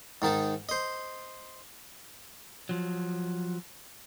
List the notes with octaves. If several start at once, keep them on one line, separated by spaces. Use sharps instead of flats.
G#2 D#3 D#4 A5
C5 D#5
F3 F#3